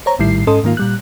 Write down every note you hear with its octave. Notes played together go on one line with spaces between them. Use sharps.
C5 C#5 A#5
A#1 A2 D#3 G3 E4 C7
G#2 C#4 A4 D#5 C6 D#6
G#2 D#3 A#3 F4
A#2 G3 F#6